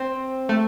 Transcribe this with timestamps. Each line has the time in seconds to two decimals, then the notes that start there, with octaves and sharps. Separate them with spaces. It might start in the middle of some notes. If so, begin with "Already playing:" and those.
Already playing: C4
0.49 A3